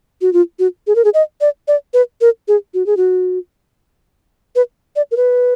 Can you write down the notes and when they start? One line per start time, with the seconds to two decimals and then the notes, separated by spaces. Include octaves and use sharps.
0.21 F#4
0.33 F4
0.59 F#4
0.87 G#4
0.96 A#4
1.05 G#4
1.14 D#5
1.41 D5
1.68 D5
1.94 B4
2.21 A#4
2.48 G#4
2.74 F#4
2.86 G#4
2.97 F#4
4.56 B4
4.96 D5
5.11 A#4
5.17 B4